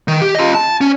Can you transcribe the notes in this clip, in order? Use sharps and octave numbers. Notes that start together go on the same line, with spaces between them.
D#3
G4
F4 D#5
A5
C#4